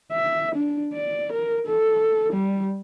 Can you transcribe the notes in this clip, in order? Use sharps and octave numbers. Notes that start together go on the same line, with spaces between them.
E5
D4
D5
A#4
A4
G3